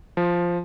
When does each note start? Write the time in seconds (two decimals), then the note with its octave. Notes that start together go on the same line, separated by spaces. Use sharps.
0.17 F3